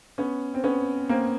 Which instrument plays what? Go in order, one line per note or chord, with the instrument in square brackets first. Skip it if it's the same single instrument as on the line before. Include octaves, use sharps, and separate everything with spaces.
[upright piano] B3 C#4
C4
B3 C#4
A#3 C4